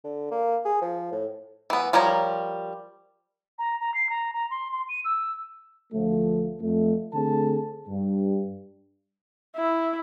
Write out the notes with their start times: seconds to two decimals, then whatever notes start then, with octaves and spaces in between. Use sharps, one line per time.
0.04 D3
0.31 A#3
0.65 G#4
0.82 F3
1.12 A2
1.70 E3 B3
1.93 F3 G3 A#4 C#5 A#5
3.59 A#5
3.80 A#5
3.94 C7
4.09 A#5
4.33 A#5
4.51 C6
4.72 C6
4.89 D#7
5.05 E6
5.93 D2 F3 A3
6.61 F2 A3
7.14 D3 A3 C4 G#4 A4 A5
7.88 G2
9.56 E4